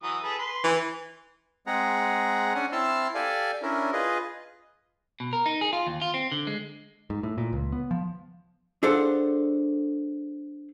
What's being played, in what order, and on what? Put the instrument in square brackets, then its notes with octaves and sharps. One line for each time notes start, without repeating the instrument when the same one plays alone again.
[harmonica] E3 F#3 D#6
G#4 A4 B4
B4 C6
[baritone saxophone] E3
[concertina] G#3 C4 G#4 F#5 A#5
C#4 D4 F#5 G#5
C4 E4 A5 C6 E6 F6
G4 A4 D5 F5 G#5
C#4 D4 E4 A#4
F4 G#4 B4 D#5
[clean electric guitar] B2
A#4
D#4
G#4
F4
D#2
F4
C4
D3
G#3
[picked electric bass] G#2
A2
A#2
C#2
B3
F3
[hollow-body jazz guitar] D4 G#4 A4 C5 F5 F#5